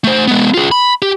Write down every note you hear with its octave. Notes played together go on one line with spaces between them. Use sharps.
A3 C5
G#3 B3
F4 G#4
B5
G4